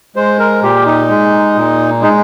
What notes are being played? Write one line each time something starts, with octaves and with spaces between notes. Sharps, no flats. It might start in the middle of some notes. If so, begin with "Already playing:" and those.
G#3 C5
A#4
A#2 G4
D#4
G#3
A#2
G#3 D#4